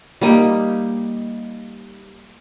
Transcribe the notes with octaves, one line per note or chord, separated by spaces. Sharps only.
G3 A#3 D#4